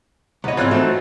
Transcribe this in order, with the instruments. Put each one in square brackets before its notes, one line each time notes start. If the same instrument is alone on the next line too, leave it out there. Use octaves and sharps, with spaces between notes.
[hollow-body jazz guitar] C2 D#5 [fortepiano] B3 C#5
[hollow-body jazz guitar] G#2 C4 [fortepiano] E3 F4 F#6
[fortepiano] F#3 C4 D#4 [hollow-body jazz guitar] A3